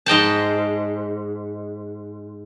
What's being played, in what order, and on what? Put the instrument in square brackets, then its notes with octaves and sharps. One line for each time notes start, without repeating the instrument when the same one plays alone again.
[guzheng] G#2 D#5 G5 A5